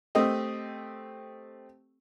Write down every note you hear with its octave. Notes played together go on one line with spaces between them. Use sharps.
A3 C4 G4 D#5